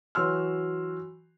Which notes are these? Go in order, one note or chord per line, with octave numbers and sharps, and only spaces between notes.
E3 F#3 F#4 C6 E6 F6